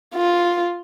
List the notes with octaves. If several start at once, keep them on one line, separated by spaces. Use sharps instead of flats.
F4